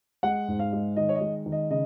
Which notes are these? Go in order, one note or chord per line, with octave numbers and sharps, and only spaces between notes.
G#3 F#5
G#2
F5
G#3
D#3 D#5
C#5
D#5
G#3
D#3
D#5
C#3 D#5